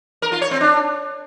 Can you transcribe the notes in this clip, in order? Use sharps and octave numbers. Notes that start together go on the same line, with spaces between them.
A#4
F4
C#5
C4
D4